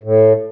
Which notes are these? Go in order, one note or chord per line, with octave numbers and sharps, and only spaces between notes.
A2